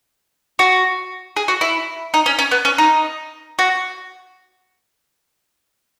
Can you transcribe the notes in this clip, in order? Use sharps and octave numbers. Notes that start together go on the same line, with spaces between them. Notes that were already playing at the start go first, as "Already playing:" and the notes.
F#4
G#4
F#4
E4
D#4
C#4
C#4
B3
C#4
D#4
F#4